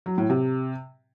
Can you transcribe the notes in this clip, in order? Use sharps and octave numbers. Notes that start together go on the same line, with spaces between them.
F#3
A2
C3